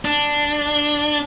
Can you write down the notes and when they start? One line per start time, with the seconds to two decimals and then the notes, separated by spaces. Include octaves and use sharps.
0.05 D4